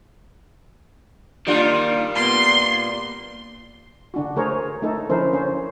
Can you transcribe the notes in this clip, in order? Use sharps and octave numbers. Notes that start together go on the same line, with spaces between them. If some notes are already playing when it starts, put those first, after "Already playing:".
D#3 G3 A#3 D4 F4
A#2 B3 C6
D3 D4 F#4
D3 A3 G#4 A#4 C5 C#5
A3 D#4 A4
D3 F3 C#4 E4 A#4 C5
D3 C#4 C5